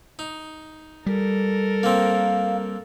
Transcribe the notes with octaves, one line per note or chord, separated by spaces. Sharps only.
D#4
G3 A4 A#4
A#3 C4 F5